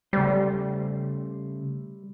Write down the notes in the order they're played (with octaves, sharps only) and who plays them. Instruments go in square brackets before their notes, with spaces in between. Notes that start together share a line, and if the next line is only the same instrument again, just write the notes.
[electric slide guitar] C#3 A3 C5 [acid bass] G3